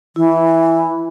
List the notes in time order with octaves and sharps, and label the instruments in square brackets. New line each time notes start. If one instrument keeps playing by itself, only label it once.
[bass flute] E3 [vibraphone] E4